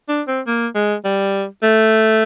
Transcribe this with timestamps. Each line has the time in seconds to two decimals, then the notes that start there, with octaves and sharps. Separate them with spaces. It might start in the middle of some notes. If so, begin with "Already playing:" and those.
0.08 D4
0.27 C4
0.47 A#3
0.75 G#3
1.05 G3
1.63 A3